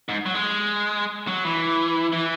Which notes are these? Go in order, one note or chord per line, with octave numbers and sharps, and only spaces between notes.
G#2
F#3
G#3
F#3
E3
E3